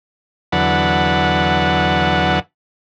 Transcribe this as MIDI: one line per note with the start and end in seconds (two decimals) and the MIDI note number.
0.52 2.39 40
0.52 2.39 50
0.52 2.39 54
0.52 2.39 71
0.52 2.39 78
0.52 2.39 81